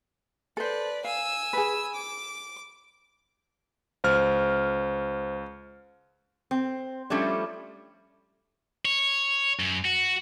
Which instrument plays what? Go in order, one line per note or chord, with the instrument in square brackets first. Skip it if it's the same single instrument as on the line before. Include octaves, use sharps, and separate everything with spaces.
[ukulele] A4 C5 [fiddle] B4 D5
[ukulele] F5 [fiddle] G#5 E6
[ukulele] G#4 B4
[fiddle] D6
[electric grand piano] C#2 F6 [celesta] C5
[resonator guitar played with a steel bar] C4
F3 G3 A3 C#4 D4
[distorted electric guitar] C#5
F#2
F#4